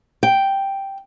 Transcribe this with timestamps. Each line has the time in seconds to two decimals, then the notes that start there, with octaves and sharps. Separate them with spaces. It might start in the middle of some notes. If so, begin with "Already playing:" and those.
0.23 G5